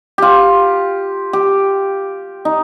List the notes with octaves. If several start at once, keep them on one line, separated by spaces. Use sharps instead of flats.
F4 G4
G4
D#4